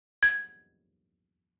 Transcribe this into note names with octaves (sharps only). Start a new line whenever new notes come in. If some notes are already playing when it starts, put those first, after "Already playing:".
G#6